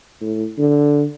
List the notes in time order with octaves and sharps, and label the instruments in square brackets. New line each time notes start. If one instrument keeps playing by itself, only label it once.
[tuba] A2
D3